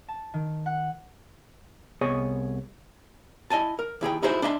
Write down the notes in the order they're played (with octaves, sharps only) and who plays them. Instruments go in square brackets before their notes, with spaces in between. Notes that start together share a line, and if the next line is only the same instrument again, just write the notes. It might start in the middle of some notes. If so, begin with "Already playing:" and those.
[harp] A5
D#3
F#5
[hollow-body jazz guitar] C2 B3 G#4 C#5 D#5 G#5
E4 D#5 G#5 A5
A#4
D#2 E4 G#4 G5
D#4 E4 F#4 G#4 C5 E5
D4 D#5 E5 G#5 C6